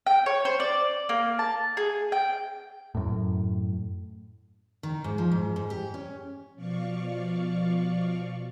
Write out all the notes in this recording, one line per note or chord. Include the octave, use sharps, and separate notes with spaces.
G5
C#5
C5
D5
A#3
A5
G#4
G5
F#2 A2
D#3
G#2
F3
G#2
G#2
G4
C#4
B2 F3 D5 F5 C#6